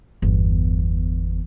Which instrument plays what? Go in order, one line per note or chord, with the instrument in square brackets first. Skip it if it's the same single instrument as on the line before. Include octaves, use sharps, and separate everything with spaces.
[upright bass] G1 E2